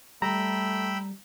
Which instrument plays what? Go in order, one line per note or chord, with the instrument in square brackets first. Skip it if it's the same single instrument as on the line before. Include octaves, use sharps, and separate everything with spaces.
[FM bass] G3 [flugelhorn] A3 [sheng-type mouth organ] G5 B5 E6 [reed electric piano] A#5